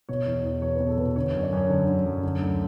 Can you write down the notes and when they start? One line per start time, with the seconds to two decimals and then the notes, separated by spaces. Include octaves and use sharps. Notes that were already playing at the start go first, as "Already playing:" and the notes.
0.09 B2 C#5
0.27 E2
0.45 E2
0.62 B2 C#5
0.75 B2 B4
0.88 A4
0.98 B2 B4
1.16 D3 C#5
1.30 C#5
1.35 F#2
1.43 D5
1.53 F#2 C#5
1.69 D3
1.87 D3
2.06 F#2
2.23 D3
2.42 D2